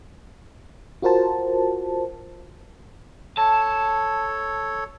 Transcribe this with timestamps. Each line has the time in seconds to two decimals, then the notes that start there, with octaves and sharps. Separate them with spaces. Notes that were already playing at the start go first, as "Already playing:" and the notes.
1.02 F4 F#4 A#4 C5 A5
3.37 A4 C#5 A5